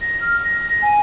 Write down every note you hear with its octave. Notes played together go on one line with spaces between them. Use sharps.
A#6
F6
A#6
G#5